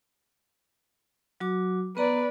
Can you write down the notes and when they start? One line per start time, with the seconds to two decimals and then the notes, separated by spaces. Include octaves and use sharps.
1.40 F#3 F#4 D6
1.97 B3 B4 D5 A#5